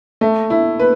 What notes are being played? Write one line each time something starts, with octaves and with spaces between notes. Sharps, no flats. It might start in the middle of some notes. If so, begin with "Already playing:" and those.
A3
E4
B4